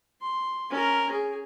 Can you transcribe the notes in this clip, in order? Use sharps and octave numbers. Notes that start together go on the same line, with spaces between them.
C6
C#4 A#4
G#4